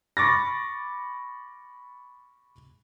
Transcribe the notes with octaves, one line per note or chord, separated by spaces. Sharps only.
B5 C#6 D6 A6 A#6